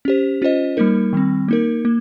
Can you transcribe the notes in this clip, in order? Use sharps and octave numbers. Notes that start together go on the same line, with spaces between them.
C#4 G4 C5
C#4 F4 C5 D#5
G3 A#3 D#4 A#4
D#3 G3 C4
A#3 D#4 A#4
A#3